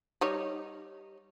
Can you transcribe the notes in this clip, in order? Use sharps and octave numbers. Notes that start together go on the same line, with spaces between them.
G3 D#4 C#5